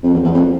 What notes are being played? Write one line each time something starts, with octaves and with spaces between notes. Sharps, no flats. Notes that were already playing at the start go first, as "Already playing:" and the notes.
F2
E2
E2
F2